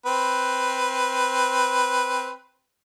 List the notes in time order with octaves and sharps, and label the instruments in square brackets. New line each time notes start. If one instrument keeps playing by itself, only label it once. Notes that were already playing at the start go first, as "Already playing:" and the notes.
[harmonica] C4 B4